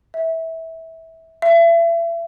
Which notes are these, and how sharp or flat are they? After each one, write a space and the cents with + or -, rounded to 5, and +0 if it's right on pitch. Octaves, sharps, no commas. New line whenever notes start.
E5 -20
E5 +35